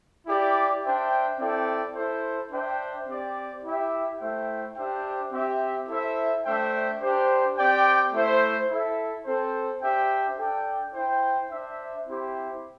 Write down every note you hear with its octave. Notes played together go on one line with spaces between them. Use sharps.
E4 G4 D5
D4 C5 E5 G5
C4 E4 A4 D5 G5
E4 A4 C5
D4 C5 E5 G5
C4 G4 D5
E4 G4 E5 G5
A3 E4 C5 E5 G5
D4 G4 C5 E5 G5
C4 G4 E5
E4 A4 C5 E5
A3 D4 C5 E5 G5
D4 G4 C5
C4 G4 D5 G5
A3 E4 C5 E5
E4 A4 E5
C4 A4 C5
D4 G4 C5 E5 G5
D4 A4 D5 G5
E4 C5 G5
D4 C5 E5
C4 E4 G4 C5